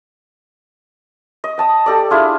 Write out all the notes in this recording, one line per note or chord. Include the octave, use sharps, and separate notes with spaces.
D#5
G5 A5 D#6
G4 A4 D5
D4 E4 F4 G#4